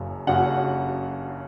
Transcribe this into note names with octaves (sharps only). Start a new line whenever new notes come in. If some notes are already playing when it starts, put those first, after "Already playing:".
Already playing: F#1 F#2 C#3
F#1 F#2 C#3 F#5